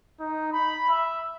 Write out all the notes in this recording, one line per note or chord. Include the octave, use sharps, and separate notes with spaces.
D#4
B5
E5